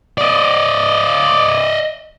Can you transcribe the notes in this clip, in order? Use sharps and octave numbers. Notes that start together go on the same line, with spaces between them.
D5 D#5